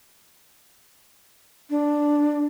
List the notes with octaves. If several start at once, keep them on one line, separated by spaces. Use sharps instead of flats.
D4